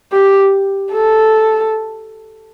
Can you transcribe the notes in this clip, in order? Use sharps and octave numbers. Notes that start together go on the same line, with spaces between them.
G4
A4